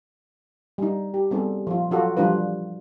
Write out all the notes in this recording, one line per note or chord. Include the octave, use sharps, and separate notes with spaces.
G3 D#4
G4
G3 B3 C4 D#4 G#4 A4
F3 F4
F#3 F4 F#4 A4
E3 F3 G3 D4 F4 B4